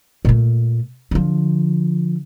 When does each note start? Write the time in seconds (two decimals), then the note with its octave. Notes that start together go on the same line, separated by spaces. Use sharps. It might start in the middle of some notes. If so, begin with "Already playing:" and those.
0.25 A#2 A3
1.11 D3 F3